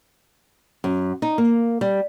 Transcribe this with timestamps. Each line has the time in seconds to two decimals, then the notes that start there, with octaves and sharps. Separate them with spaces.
0.84 F#2
1.22 D#4
1.38 A#3
1.81 G3